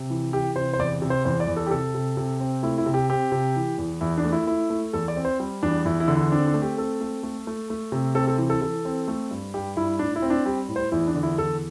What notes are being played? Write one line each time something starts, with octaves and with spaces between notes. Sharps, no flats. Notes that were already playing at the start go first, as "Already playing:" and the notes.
Already playing: C3
E3
E3 G4
C3 C5
C5
E2 D5
C3
C5
E2 C5
D5
E2
A4
G4
C3 A4
C3
C3
C4
A3 E4
E4
C3
G4
C4 G4
C3
E3
E2
E2 E4
D4
A3
E4
A3 E4
A3
E2 A4
D5
C4
C5
G3
E2 D4
E2 E4
E4
D3
E4
C4 D4
D4
A3
G4
C4 A4
A3
A3
A3
A3
C3
C4 A4
A4
E3
A4
E3 A4
C4
A3
G2
G2 G4
G2 E4
A2 D4
E4
C4
D4
G3 G4
A2
C5
E2 E4
D4
D3
E4
E2 A4